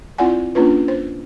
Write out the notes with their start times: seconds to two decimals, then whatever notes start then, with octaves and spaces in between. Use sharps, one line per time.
0.18 C4 E4 F4 D5 F#5 G#5
0.55 A#3 C#4 D4 F4 B4
0.88 C5